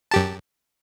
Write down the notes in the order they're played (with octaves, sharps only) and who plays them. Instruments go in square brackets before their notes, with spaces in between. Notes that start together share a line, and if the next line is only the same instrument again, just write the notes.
[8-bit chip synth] F#2 G4 A5